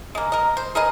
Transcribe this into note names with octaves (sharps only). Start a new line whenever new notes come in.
G#3 A#3
A#4 D#5
C5
G#4 A#4 B4 D#5